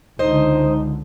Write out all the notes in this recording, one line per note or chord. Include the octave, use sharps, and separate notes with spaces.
C#2 D3 D#4 C5 D#5